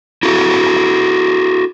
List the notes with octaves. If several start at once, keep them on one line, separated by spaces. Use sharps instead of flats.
E4 F#4 A4